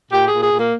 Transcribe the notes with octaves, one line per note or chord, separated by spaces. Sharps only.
A#2 G4
A#2 G#4
G#4
A#2
A#3